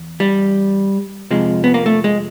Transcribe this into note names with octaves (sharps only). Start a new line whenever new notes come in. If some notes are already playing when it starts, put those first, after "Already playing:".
Already playing: E2
G3
F2 C3 F3 G#3
B3
A#3
A3
G#3